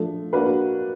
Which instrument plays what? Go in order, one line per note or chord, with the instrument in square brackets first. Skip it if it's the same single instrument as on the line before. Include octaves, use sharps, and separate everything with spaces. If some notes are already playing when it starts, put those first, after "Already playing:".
Already playing: [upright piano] F3 A3 D4
A#3 D4 F#4 B4